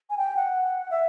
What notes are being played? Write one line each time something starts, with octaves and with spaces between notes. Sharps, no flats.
G#5
G5
F#5
E5